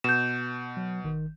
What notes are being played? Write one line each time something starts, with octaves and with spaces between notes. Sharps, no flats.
B2 G6 E7
F#3
G#1 D#3